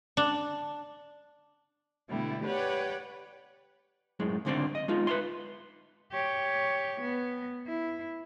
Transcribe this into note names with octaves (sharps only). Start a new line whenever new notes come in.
D4
B2 D3 G3 A3 E4
G4 B4 C#5 D5 F#5 G5
F#2 A2 G#3
C#2 G#2 D3 C4 C5 D5
D#5
G#3 D#4 F4
B4 E5 C6
G4 C#5
B3
E4